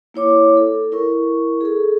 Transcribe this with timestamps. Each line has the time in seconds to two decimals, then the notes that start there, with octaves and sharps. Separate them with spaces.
0.14 A#3 E4 C#5 D6
0.57 A4
0.92 E4 A#4 C#6
1.61 G#4 A4